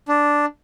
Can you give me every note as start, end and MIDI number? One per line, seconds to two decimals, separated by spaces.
0.08 0.46 62